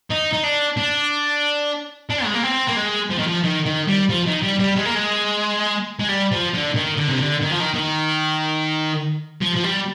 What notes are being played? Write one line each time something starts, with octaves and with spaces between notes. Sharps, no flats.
D#4
D#4
D4
D4
D4
G#3
A#3
C4
A#3
G#3
F3
D#3
F3
D#3
D#3
G3
F3
D#3
G3
G3
G#3
A#3
G#3
G#3
G3
F3
D3
D#3
D3
C3
D3
D#3
F3
D#3
D#3
F3
F3
G3